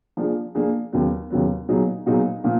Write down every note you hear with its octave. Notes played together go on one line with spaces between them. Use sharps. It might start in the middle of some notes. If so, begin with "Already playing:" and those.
F3 A#3 D4 F4 G#4
F3 A#3 D4 F4 G#4
D#2 C#3 F#3 B3
D#2 C#3 F#3 B3
A#2 F#3 B3 D#4 G#4
A#2 F#3 B3 D#4 G#4
A#2 F3 A#3